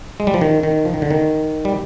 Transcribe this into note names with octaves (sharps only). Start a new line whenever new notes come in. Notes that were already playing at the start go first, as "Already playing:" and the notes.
G#3
G3
F3
D#3
D#3
F3
D#3
D3
D#3
G3